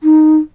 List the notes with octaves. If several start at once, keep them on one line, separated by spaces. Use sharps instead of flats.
D#4